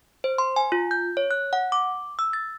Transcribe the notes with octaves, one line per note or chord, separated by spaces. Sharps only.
C5
C6
G#5
F4
G6
C#5
F#6
F#5
D6
E6
A6